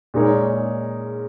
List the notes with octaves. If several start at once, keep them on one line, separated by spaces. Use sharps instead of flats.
A#2 G#3 D#4 A#4 C#5